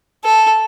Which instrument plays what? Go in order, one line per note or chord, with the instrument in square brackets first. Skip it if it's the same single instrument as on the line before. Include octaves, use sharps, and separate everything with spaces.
[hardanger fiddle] A4